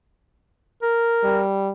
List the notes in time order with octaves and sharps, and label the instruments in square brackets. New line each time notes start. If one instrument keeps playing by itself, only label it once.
[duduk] A#4
[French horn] G3